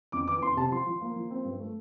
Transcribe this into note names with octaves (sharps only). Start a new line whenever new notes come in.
F2 D6
E3 D6
F2 C6
C3 A5
F3 C6
F3
A#3
F3
C4
G2
A3